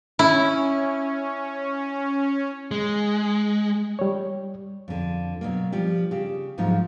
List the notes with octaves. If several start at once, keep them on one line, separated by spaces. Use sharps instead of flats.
C#4 E4
G#3
G3 C#5
F2 D3
B2 F#3 A#3
F3 G3 G4
C#3 G4
D2 G#2 F3 F#3 D#4